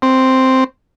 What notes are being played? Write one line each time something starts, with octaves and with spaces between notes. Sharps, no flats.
C4